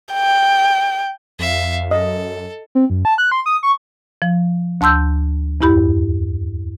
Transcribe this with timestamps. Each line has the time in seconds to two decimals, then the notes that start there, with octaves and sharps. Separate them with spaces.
0.13 G5
1.39 F2 E5 F5
1.91 F#2 A4 D#5
2.75 C4
2.90 F#2
3.05 A5
3.18 F#6
3.32 C6
3.46 D#6
3.63 C#6
4.22 F3
4.81 D2 A5 C6 E6 G6
5.61 E2 G2 E4 G4 B5